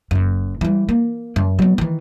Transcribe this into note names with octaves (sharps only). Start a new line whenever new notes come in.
F#1 F#2
E3 G3
A#3
F#2
F#3 B3
D#3 E3